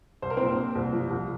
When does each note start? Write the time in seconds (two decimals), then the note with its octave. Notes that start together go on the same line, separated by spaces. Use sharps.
0.22 C2 C5
0.30 A#4
0.37 A#2 C4 C5
0.58 A#2
0.75 C2
0.92 F3
1.10 C2